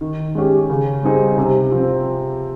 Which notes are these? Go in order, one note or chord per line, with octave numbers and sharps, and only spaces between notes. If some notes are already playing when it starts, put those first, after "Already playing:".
D#3
G#3 C#4 G4
C#3
G3 C4 D#4 G#4
C3
F3 C4